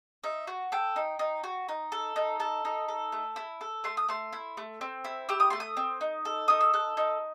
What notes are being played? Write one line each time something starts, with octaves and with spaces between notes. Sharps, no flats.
D#4 E5
F#4
A4 G5
D#4
D#4
F#4
D#4
A4
D#4
A4 A5
D#4
A4
A3
E4
A4
A3 C6
D#6
A3 C6
E4
A3
C4
E4
G4 E6
D#6
A3 C6
D#6
C4
D#4
A4
D#4 D#6
E6
A4 F#6
D#4